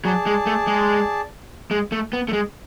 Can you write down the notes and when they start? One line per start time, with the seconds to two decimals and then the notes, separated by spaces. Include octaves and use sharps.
0.05 F#3 G#4 D5 A5
0.26 G#3
0.46 A3
0.67 G#3
1.71 G#3
1.92 A3
2.13 B3
2.29 A3
2.33 G#3